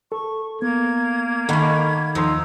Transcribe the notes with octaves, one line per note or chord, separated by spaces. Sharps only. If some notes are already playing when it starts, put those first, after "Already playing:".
A4 C#6
A#3 B3 G#6
D#3 A3 A4 F#5 B5
D#2 F3 D#4 C6 E6